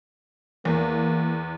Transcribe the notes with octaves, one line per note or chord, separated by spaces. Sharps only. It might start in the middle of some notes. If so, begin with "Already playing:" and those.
E2 A#3